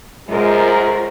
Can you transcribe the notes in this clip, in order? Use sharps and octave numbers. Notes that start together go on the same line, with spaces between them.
F#2 G#3 F4 A#4 C5